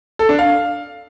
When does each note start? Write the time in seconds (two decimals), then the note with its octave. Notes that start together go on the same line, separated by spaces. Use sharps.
0.19 A4
0.29 D4
0.39 F5